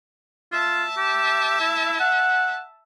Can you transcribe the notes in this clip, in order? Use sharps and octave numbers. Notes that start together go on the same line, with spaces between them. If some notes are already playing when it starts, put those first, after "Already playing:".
F4 E5 A5
G4
E4
F#5